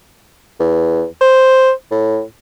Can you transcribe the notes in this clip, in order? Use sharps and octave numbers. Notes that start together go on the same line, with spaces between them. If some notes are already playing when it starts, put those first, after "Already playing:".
E2
C5
A2